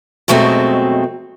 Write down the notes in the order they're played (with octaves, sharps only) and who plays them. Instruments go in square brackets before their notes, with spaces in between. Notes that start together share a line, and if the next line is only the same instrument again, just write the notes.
[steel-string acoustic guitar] F2 B2 F#3 G#3 A3 C4